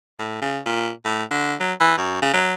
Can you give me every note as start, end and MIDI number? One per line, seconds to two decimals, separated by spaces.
0.19 0.41 45
0.41 0.59 49
0.66 0.90 46
1.05 1.23 45
1.30 1.54 50
1.60 1.72 54
1.80 1.96 52
1.97 2.17 42
2.22 2.32 49
2.33 2.54 54